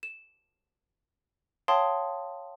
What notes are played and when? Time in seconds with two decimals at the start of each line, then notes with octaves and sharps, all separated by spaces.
0.03 E7
1.68 C#5 F5 G5 A5 C6 D#6